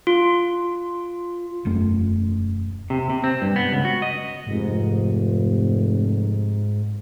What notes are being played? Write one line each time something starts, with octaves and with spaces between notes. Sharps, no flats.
F4
E1 F#2 A3
C3
C3
C4
G2
B3
C#2
F#4
D#5
F1 G#2